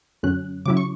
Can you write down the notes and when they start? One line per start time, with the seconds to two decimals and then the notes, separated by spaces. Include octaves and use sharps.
0.23 F#2 D3 F#3 C#4 F#6
0.66 C#3 F#3 C#4 E4 D6
0.77 C#6